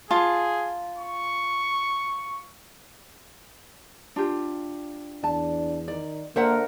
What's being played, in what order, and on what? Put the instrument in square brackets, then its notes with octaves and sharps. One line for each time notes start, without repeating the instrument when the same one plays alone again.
[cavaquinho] F4 A5 [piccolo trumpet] G#4
[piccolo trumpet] C#6
[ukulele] D4 F4 G4
[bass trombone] E2 [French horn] D4 [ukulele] A5
[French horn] D#3 [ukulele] D5
[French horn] D3 [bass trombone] A#3 [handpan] A#4 [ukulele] C5 E5 F#5